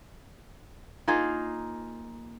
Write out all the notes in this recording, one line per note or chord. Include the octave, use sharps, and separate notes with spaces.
A#3 D#4 F4 G#4